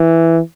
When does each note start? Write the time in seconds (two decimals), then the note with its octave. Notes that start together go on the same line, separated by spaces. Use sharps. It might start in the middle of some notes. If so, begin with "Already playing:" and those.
Already playing: E3